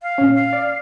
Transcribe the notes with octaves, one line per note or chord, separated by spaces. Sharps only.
F5
A#2 C#4
F5
D5